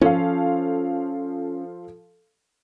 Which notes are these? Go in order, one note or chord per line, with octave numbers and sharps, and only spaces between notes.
F3 C#4 A4 F5